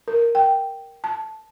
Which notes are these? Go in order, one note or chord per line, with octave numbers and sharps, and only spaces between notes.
A#4
G5
A5